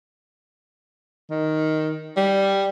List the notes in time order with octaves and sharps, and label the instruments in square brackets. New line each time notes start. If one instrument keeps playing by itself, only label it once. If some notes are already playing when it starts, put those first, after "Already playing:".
[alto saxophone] D#3
G3